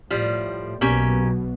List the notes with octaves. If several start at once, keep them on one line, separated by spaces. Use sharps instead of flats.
A2 F3 G3
B1 B2 A#3 C#4 G4